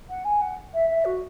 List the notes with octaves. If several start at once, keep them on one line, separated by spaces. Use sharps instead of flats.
F#5
G#5
F#5
E5
E5
F#4